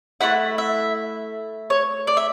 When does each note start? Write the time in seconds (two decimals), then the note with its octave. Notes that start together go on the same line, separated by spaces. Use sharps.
0.21 A3 C#4 E4 F#5
0.58 E5
1.70 C#5
2.07 D5
2.17 E5